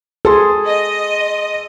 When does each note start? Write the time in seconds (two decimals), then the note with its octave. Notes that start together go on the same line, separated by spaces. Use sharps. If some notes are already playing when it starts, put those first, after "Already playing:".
0.25 G#4 A4 C6
0.66 D#5